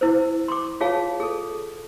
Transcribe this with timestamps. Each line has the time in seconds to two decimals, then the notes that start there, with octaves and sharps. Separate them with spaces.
0.01 E4 A#4 C5
0.48 C6 D6
0.81 F4 G#4 C#5 F5 A5
1.20 G#4 A4